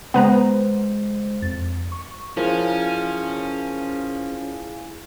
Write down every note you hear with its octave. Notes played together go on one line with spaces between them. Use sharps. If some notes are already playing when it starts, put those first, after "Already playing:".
C#3 G#3 B3 B4 C5 A#5
F2 A6
C#6
F3 C#4 E4 G#4 A#4 F5 G#5